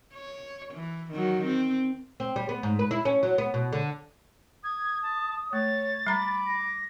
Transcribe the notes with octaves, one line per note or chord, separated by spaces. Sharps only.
C#5
E3
D#3 F#3
C4
C4
G3
B3
G#2
B4
E4
C#4
F#3
B3
B2
D3
D#6 G#6
A5
A3 C#5 A6
G3 A#5 B5 D6
A#6